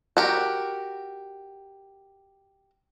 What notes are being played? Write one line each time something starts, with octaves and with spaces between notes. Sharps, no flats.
F#4 G4 A#4